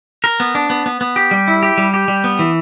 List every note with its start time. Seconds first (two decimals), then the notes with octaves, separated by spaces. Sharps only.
0.24 A#4
0.40 B3
0.55 D4
0.70 B3
0.86 B3
1.01 B3
1.16 G4
1.31 G3
1.48 E4
1.63 G4
1.78 G3
1.94 G4
2.08 G3
2.24 B3
2.39 E3